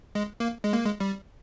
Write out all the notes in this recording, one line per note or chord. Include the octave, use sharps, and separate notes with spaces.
G#3
A#3
G#3
A#3
G#3
G3